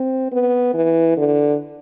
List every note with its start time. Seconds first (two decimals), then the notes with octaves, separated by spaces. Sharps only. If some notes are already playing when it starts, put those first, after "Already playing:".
Already playing: C4
0.32 B3
0.74 E3
1.17 D3